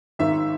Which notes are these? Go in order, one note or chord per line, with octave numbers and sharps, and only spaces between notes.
G#1 G#2 D#3 E5